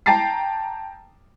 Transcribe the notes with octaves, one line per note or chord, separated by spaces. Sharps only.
G5 A5 A#5 A6 C7